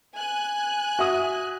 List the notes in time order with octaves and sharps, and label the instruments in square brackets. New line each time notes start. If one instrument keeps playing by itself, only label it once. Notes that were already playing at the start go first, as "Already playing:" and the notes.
[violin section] G#5 F#6
[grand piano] F#4 E5 D#6